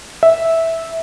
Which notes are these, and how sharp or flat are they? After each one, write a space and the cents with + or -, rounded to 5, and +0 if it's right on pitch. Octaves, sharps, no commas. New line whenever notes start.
E5 -10